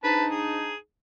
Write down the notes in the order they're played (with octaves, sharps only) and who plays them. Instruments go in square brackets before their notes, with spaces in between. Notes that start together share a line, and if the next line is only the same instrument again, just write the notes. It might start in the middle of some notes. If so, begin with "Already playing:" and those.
[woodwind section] G#2 D4 D#4 [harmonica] B4 A5
[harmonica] G#4